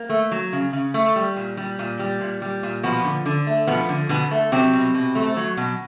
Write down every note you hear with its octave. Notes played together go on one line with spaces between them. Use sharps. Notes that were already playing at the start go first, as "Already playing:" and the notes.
Already playing: A#3
A3
F#3
C#3
C#3
A3
G3
A#2
G3
A#2
G3
A#2
G3
A#2
B2 F3 B3
D3
D3
A3
B2 F3 B3
D3
B2 D3 B3
A3
C3 F#3 C4
B2
B2
A3
F#3
B2